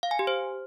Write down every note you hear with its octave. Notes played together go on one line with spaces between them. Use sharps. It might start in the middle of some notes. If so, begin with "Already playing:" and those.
F5
G#5
G4
C5